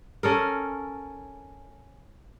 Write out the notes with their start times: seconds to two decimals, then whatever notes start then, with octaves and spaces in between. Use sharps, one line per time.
0.23 C#4 A4 A#4